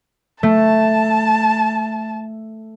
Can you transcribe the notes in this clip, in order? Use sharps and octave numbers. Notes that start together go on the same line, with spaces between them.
A3 A5